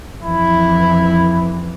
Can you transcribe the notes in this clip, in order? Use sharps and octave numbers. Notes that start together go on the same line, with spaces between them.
F2 E3 E4